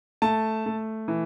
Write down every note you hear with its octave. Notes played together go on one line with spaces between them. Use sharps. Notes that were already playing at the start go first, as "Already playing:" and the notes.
A3 A5
A3
E3